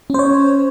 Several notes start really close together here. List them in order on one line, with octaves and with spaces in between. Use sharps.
C#4 C5 C#5